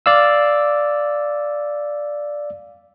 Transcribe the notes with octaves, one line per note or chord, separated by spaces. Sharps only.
D5 F5 E6